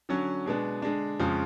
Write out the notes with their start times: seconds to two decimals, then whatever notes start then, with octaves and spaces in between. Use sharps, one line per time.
0.09 D3 F#3 C#4
0.46 B2 G#3 B3 D4
0.82 D3 G#3 D4
1.19 F2 C#3 F3 G#3